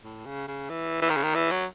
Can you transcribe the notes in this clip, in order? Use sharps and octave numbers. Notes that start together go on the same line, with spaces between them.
A2
C#3
C#3
E3
E3
D#3
C#3
D#3
E3
F#3